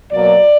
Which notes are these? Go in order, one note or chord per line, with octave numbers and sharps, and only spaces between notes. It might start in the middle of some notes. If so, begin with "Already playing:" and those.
B2 F#3 A#3 D5